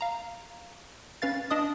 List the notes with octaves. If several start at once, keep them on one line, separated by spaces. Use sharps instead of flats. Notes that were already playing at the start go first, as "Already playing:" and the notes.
F5 A#5
C#4 B4 F5 A6
D4 D#5 D#6